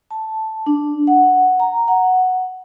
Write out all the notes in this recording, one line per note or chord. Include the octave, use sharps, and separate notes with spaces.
A5
D4
F#5
A#5
F#5